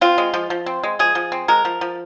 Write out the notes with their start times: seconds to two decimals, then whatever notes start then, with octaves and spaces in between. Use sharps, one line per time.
0.01 C4 F4
0.18 G#3
0.34 F3
0.50 F3
0.66 C4
0.83 G#3
0.99 F3 G#4
1.15 F3
1.32 C4
1.48 G#3 A#4
1.65 F3
1.81 F3